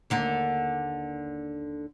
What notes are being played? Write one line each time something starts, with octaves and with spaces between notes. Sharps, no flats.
D#2 D3 A#3